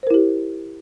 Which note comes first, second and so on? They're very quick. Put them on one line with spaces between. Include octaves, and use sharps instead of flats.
C5 A#4 E4 G4